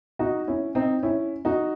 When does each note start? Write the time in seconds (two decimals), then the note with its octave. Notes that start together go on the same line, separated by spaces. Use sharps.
0.19 D#4 F#4
0.47 C#4 E4
0.75 C4 D#4
1.03 C#4 E4
1.45 D#4 F#4